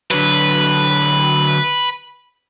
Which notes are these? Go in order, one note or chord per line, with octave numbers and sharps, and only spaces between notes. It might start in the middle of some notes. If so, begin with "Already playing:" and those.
D3 F#3 B4